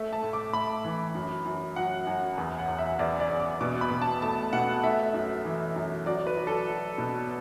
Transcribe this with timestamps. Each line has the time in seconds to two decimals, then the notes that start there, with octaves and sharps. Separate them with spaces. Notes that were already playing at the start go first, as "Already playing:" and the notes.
Already playing: A3 E5
0.13 A5
0.23 A2
0.33 D6
0.53 A2 B5
0.85 E3
1.15 F#2
1.45 F#2
1.76 F#3 F#5
2.07 F#2
2.38 E2
2.59 F#5
2.68 E2
2.79 E5
2.99 E2 D5
3.20 D5
3.30 E2
3.40 D6
3.61 B2 D6
3.81 B5
3.91 B2
4.02 A5
4.22 A3 A5
4.53 B2 F#5
4.84 A3 E5
5.14 F#2
5.45 E3
5.76 F#2
6.06 F#3 D5
6.27 B4
6.37 F#3
6.47 A4
6.68 F#3
6.98 B2